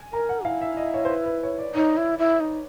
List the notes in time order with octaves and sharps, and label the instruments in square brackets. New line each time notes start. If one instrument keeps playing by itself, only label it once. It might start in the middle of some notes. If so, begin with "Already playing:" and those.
Already playing: [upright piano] G#5
[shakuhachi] A#4 [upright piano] A#5
[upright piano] F#5
[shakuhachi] E4 [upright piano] F5
[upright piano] E5
D#5
C#5
C5
B4
B4
C#5
D5
[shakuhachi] D#4 [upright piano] C#5
[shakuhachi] E4
E4
D#4